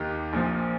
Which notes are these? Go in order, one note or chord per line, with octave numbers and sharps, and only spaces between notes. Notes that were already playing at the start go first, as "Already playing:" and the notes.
Already playing: D#2 D#3 A#3 G4
A#1 A#2 F3 C4